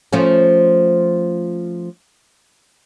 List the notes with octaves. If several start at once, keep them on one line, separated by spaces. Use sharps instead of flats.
F3 A3 C#4